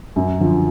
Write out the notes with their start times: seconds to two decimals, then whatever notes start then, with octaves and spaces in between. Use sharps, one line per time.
0.16 F#2
0.40 D3 F3